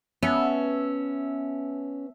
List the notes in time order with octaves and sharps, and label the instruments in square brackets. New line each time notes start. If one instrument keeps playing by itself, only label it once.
[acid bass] B3 [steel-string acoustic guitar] C#4 [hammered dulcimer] E5 A5